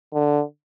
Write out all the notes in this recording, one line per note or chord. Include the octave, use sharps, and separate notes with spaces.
D3